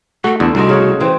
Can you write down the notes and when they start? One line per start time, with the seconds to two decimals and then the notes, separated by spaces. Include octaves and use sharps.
0.24 A3 F#4 A4
0.40 E2 D3 A5
0.55 C2 D#4 F#4 C5 D5
0.69 C#3 C#5 F#5
1.00 E3 C4 C5